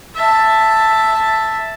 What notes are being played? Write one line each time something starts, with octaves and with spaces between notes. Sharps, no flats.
E5 A5